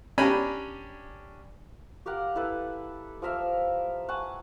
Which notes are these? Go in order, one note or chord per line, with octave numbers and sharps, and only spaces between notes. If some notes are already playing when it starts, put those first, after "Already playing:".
C#4 D4 G4 G#5 A#5 B5
G4 A#4 F5 F#5
E4 A4 B4
F3 A#4 E5 F5
F#5 G#5 A5 C#6